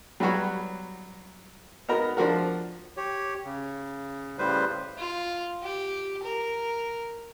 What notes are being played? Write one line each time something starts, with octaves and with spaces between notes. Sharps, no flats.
F#3 G3 B3 F#4 C#5
B3 D#4 F#4 A#4 A#5
F3 D4 F#4 A#4
G4 C#5
C#3
A2 C#3 G3 B4 C5
F4
G4
A#4